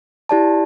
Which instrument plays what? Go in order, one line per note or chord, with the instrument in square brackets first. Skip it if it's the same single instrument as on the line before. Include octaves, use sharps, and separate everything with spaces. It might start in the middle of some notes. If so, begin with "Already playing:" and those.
[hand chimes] E4 G4 D5 A5